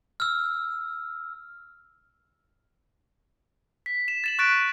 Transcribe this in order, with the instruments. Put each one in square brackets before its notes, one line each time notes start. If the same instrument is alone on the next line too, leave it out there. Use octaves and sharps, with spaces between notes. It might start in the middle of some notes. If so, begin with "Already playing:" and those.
[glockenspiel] E6 F6
[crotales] B6
E7
A6 E7 F#7
C#6 F#6 A6 B6 D7